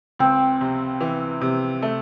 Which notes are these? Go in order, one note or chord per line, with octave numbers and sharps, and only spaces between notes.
C#2 C4
C3
E3
C3
A3